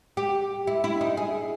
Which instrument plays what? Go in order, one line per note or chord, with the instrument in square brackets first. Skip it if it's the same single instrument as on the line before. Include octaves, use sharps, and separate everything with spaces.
[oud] G4
E4
E4
D#4
G#4